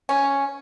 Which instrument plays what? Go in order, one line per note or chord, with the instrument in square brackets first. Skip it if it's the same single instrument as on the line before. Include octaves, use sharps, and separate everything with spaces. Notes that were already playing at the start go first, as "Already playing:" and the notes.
[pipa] C#4